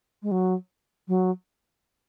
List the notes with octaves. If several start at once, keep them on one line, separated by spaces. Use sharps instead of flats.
G#3
F#3
F#3